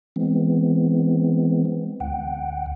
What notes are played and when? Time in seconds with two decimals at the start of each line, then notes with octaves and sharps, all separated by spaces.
0.16 E3 G#3 B3 C4
2.00 D2 F#5 G5